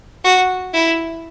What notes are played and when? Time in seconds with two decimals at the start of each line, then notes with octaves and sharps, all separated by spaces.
0.24 F#4
0.74 E4